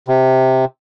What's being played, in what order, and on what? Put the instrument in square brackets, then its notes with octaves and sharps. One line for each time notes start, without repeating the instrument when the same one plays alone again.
[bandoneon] C3